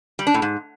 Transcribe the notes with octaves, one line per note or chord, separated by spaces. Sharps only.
G3
D4
A2
G#2